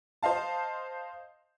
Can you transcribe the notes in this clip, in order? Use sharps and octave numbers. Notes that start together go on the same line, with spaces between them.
C5 D#5 F5 A5